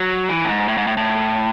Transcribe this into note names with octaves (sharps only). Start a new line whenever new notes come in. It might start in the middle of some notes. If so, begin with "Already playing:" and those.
Already playing: F#3
E3
A2
G#2
A2
G#2
A2
A2